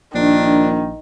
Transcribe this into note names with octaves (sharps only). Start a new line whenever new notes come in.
A#1 D#3 D4